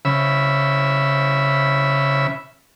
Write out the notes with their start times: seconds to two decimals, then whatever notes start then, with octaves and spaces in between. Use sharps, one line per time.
0.05 C#3 E5 B5